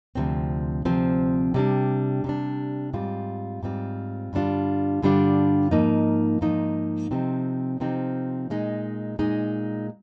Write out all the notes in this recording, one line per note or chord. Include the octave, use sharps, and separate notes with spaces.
D2 C3 F3 C4
D2 C3 F3 C4
C3 G3 D4
C3 G3 D4
G#2 G3 C4 F4
G#2 G3 C4 F4
G2 D3 G3 D4 F4
G2 D3 G3 D4 F4
G#2 F3 A#3 D#4
G#2 F3 A#3 D#4
C3 F3 C4 D#4
C3 F3 C4 D#4
A#2 G#3 D#4
A#2 G#3 D#4